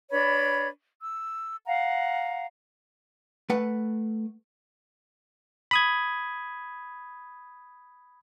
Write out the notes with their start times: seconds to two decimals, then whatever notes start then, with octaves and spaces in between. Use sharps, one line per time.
0.11 D4 B4 C#5 B5
1.02 E6
1.66 F5 F#5 A#5
3.50 A3 B4 F#5
5.71 B5 D#6 G#6